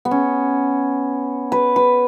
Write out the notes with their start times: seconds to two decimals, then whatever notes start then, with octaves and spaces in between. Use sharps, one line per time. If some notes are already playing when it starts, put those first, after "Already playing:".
0.05 B3
0.11 C#4
1.52 B4
1.76 B4